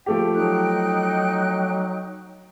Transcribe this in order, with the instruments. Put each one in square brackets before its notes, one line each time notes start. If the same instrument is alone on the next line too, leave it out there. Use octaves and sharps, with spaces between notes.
[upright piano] F3 A3 G4 [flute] G5
[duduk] F#3 [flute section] D#4 F#6